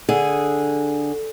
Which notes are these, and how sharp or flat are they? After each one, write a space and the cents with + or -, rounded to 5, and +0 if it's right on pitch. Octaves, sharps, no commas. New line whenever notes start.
D3 +0 G#4 +0